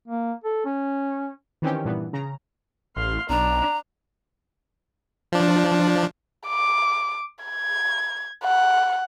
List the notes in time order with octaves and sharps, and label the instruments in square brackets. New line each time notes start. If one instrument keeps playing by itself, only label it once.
[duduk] A#3
A4
C#4
[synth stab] D#3 E3 C4 C#4 G4
G2 A#2 E3 B3
C#3 A#5
[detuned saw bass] A1 [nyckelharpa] F5 C6
[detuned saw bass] B1 [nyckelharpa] D4 [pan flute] A#5
[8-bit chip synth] F3 D4
[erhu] D6
G#6
F#5